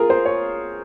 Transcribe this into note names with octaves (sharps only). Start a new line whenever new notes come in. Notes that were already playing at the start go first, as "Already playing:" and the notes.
Already playing: F4 G#4 A#4
C5
C#5